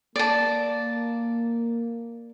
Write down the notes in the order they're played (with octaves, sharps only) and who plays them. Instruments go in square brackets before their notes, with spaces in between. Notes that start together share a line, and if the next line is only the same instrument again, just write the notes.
[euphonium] A#3 [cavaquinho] D5 A5